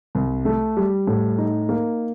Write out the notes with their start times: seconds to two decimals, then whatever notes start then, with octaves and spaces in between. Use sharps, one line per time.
0.15 C2
0.45 A3
0.77 G3
1.07 A2
1.38 D#4
1.69 A#3